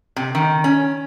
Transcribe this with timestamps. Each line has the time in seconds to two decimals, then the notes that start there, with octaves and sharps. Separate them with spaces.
0.16 C3
0.35 D#3
0.64 C#4